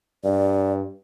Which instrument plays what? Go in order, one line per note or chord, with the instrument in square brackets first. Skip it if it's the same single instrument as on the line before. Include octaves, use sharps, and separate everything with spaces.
[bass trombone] G2 [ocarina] D5